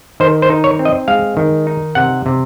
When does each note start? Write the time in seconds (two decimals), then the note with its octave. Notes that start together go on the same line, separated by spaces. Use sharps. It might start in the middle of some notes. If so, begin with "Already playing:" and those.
0.20 D#3 C5
0.42 C5
0.50 D#4
0.64 C#5
0.79 C4
0.85 D#5
1.08 G#3 F5
1.37 D#3
1.67 D#4
1.95 C3 F#5
2.26 C3